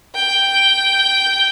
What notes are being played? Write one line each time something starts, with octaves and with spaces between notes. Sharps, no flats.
G5